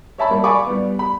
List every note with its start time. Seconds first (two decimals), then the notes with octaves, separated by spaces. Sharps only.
0.18 C#5 E5 A5 B5
0.31 G3 A#3
0.44 D5 F5 G#5 B5 C#6 D6
0.67 G3 B3
0.99 B5